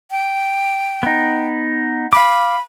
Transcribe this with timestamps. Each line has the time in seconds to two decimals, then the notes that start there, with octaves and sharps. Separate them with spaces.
0.11 G5
1.03 B3 D#4
2.13 F5 B5 D6